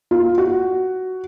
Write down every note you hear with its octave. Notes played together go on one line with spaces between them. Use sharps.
F4
F#4